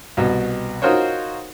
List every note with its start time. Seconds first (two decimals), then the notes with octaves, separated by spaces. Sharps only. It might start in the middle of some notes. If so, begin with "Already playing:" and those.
0.17 C2 B2
0.82 D#4 F4 F#4 A#4 C5 C#5